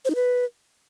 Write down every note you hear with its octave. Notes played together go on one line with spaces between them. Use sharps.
C5
D#4
B4